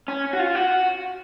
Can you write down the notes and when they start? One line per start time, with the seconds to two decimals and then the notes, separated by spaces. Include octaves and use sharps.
0.08 C#4
0.33 F#4
0.39 F4
0.55 F#4